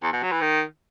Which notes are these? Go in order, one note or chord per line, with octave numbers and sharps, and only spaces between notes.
E2
B2
F#3
E3
D#3